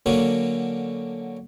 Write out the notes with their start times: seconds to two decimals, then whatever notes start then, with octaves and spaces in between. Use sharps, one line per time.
0.06 D3 F#3 A#3 C#4 D4 F#4